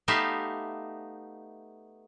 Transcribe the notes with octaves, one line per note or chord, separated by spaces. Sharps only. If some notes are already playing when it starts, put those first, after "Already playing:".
A3 B3 D#4 G4 E5 F5